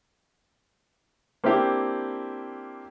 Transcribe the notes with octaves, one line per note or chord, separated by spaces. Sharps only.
A#3 C4 D4 E4 G4